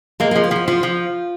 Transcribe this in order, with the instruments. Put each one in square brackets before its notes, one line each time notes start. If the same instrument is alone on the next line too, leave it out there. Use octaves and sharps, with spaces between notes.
[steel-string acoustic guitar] G#3 [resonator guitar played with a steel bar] A#3
[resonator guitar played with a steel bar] F3 [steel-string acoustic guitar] G#3
[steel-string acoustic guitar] F4
[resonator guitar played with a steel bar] F3 [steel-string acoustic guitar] F#4
[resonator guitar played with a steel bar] F3 [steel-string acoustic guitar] F4
[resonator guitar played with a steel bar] F3